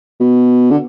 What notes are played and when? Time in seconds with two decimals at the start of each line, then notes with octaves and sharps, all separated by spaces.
0.21 B2
0.71 D3